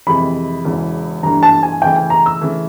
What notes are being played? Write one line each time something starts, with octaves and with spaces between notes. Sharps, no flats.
F2 C3 E3 G#3 B5
E1 E2 C#3 E3
G2 E3 A3 D4 A#5
A5
G#5
C#3 E3 A3 G5
G#5
A#5
E6
C#3 E3 A3